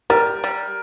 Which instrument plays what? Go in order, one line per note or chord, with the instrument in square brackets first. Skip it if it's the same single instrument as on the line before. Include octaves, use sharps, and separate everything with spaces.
[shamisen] G3 [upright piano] A#4
[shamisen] G3